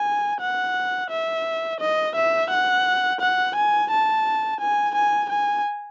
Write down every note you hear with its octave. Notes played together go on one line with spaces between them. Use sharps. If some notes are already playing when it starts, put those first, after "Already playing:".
Already playing: G#5
F#5
E5
D#5
E5
F#5
F#5
G#5
A5
G#5
G#5
G#5